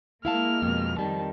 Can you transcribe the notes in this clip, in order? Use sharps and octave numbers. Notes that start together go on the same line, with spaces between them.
G#3 A#3 E4 F5 A5 F6
F2 B2
F2 D#3 G3 A5